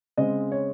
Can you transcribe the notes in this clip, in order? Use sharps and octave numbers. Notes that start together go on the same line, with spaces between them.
C#3 G#3 C4 D#5
C#5